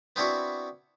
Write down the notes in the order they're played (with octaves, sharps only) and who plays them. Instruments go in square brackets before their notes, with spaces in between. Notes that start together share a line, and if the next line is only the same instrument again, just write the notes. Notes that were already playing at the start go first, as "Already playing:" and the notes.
[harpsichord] B3 C4 D4 E4 F#4